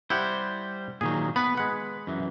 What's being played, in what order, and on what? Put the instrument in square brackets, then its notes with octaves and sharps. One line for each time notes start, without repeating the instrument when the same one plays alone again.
[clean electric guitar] G3 C5 [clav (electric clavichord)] E4 G4 F#5
[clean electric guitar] A#2 D#3 F#3 [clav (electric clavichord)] G#4
[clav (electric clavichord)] B3 [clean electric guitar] B4 B5
[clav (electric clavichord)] G#3 F#5
[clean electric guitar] F#2 E3